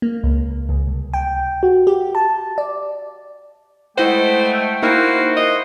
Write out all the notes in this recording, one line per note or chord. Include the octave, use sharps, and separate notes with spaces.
A#3
C#2
C#2
C2
G5
F#4
G4
A5
D5
G#3 A3 E4 C5 D#5 F#5 G5
A#3 D#4 E4 F#4 A#4 C5
D#5